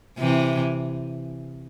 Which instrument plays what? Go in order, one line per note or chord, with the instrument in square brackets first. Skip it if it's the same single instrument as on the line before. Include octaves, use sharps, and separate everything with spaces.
[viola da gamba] C3 E3